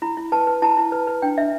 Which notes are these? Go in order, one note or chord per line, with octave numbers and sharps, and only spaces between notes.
E4 B5
E4
B4 A5
B4
E4 A5
E4
B4
B4
D4 G5
D4 E5